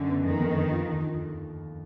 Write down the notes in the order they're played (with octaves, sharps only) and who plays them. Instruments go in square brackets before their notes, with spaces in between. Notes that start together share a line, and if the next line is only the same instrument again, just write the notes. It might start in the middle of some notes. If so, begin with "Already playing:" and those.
Already playing: [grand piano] F#2 [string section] D3
[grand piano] B3
[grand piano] F2 [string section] D#3
[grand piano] F2
D3
F4
D#2